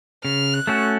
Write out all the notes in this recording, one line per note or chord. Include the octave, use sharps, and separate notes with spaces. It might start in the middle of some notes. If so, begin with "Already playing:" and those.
C#3 F6
F#6
A3 C#4 F#4 A4